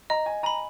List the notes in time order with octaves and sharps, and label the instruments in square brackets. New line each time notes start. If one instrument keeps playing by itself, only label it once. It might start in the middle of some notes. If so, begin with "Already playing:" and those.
[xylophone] D#5 [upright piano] A#5
[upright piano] G#5
[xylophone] G#5 B5 [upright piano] A#5